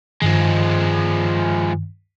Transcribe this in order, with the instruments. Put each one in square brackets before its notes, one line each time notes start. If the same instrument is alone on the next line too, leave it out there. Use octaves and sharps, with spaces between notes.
[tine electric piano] G2 D#3 [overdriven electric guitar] F3 G#3